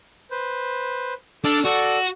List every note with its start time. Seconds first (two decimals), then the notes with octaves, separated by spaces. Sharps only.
0.31 B4 C5
1.44 D4 A4 D6 F6
1.65 F#4 A4 D5